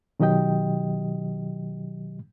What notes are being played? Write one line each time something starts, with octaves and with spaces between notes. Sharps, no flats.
B2 D#3 F#3 G4 D#5 G5